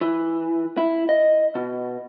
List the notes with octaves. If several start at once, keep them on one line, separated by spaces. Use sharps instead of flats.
E3
E4
D#5
B2